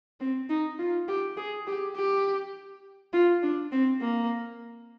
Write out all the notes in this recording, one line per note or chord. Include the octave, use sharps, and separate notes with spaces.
C4
D#4
F4
G4
G#4
G4
G4
F4
D4
C4
A#3